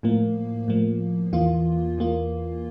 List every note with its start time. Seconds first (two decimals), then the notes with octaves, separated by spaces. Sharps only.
0.03 A2 F3 A#3
0.68 A2 F3 A#3
1.33 E2 E3 A#3 F4
1.98 E2 E3 A#3 F4